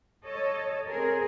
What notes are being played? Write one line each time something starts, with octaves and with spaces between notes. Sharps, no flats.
A4 C#5 D#5
C4 G#4 A#4